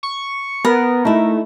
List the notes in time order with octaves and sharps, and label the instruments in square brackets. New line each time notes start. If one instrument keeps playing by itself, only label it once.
[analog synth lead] C#6
[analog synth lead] B3 [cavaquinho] A#4
[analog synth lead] A3 [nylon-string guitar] D#4 E4